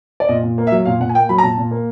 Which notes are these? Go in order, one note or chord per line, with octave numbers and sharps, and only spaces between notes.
D5
A#2 D#5
A#2
A#3
E5
F#3
A#2 F5
A#2 F#5
G#5
A#3 G5
F#3 B5
A#5
A#2 A5
A#2
A#3